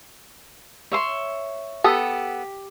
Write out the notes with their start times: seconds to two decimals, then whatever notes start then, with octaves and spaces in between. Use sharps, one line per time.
0.92 C#5 E5 C6
1.84 B3 G4 A4 D#6